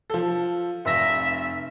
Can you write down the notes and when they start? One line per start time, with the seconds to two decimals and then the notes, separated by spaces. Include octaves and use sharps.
0.10 F3 A4
0.85 F1 E5 F5 A#6